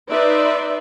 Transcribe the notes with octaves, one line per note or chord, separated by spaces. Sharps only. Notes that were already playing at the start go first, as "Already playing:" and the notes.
D#4 B4 D5 E5 C6